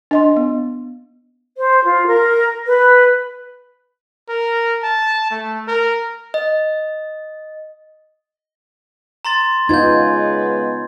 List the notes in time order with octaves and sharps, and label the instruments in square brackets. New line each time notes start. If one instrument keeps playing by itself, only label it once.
[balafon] D4 D#5 C6
B3
[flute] C5
F4
A#4
B4
[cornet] A#4
A5
A3
A#4
[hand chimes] D#5
[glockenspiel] A#5 C6 A6
[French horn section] C#3 G#3 B3 [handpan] D#4 F4 [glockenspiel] G6 G#6